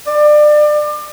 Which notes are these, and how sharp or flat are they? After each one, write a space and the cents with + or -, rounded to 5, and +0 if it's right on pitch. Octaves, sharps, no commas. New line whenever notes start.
D5 +30